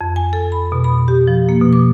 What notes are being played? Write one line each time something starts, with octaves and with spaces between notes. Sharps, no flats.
F2
G#5
A4
B5
B2
B5
G4
F3
A#3
B2
D6